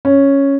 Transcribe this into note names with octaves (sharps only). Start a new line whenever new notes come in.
C#4